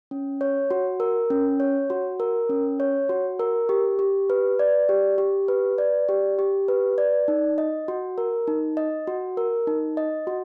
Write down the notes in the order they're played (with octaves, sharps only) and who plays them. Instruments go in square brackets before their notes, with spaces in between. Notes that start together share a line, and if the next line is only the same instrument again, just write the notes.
[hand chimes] C#4
C#5
F#4
A#4
C#4
C#5
F#4
A#4
C#4
C#5
F#4
A#4
G4
G4
B4
D5
G4
G4
B4
D5
G4
G4
B4
D5
D#4
D#5
F#4
A#4
D#4
D#5
F#4
A#4
D#4
D#5
F#4